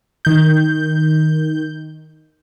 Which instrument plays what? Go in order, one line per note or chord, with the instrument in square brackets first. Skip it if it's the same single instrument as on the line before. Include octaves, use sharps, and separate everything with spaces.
[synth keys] D#3 G6